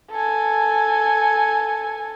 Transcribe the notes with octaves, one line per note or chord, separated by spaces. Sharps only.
A4 G#5